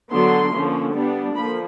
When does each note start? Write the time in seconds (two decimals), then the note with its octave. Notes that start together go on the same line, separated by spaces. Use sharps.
0.12 D3 F#3 B3 D4 C6
0.54 D3 F3 A#3 C#4
0.94 G3 B3 D4
1.35 D3 F3 A#3 B5